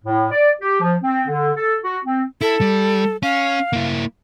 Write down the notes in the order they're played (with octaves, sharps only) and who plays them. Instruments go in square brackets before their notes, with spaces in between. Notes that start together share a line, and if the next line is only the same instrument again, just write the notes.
[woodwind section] A2
D5
G4
F3
C4
D3
A4
F#4
C4
[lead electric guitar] E4 [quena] A4
[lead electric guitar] G3
[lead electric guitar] C#4 [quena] F5
[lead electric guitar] A#3 E4